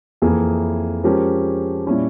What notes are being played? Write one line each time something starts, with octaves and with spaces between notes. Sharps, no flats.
F2 E3 A#3 E4 G#4
F3 G#3 C#4 G4 A#4
A#2 G3 C#4 E4